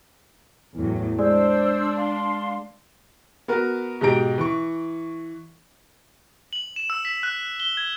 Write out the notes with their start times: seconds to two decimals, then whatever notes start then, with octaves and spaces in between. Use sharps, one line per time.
0.76 E2 A2 F#3
1.19 G#3 D4 C5 D5 E6
1.96 F5 C6
3.48 B3 F#4 A#4
4.01 G#2 B2 D#4 G4 A#5 D7
4.38 E3 C#6
6.53 F#7
6.76 E7
6.90 E6
7.05 B6
7.23 F#6
7.60 G7
7.77 G#6